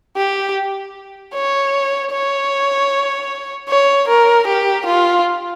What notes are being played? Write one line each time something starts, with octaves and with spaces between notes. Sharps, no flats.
G4
C#5
C#5
C#5
A#4
G4
F4